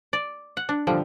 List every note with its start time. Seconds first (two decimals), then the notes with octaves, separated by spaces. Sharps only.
0.13 D5
0.57 F#5
0.69 D4
0.87 D3 F3 G3